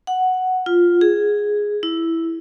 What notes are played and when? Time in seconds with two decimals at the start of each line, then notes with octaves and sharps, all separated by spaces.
0.07 F#5
0.66 F4
1.01 G#4
1.83 E4